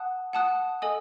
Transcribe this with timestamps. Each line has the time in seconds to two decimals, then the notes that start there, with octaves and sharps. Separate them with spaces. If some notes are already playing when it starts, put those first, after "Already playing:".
Already playing: F#5 A5 D#6 F#6
0.33 F#5 A5 D#6 F#6
0.82 A4 D#5 G#5 D#6